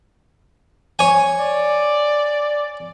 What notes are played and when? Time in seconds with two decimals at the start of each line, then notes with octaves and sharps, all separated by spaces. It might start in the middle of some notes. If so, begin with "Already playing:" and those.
0.99 C#5 G#5
1.39 D5